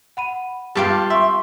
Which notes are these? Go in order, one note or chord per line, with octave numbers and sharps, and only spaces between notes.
F#5 B5 D#7
G2 G3 F4 G4 A5
E5 C6 C#6